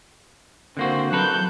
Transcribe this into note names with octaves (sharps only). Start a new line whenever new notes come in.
D3 A#3 C4 F#4 C5
F#3 A4 B4 F#6 G6